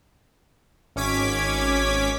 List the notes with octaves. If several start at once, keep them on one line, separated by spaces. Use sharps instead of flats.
G#1 C#4 D6 G#6 B6